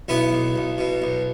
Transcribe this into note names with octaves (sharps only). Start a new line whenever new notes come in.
B1 B3 E4
B1
B1
B2
B1